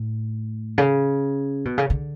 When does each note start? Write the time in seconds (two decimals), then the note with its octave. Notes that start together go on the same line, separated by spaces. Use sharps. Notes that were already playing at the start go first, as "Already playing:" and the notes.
Already playing: A2
0.78 C#3
1.65 B2
1.78 C#3
1.90 D3